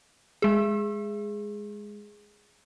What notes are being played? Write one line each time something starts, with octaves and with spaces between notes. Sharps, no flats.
G#3 G#4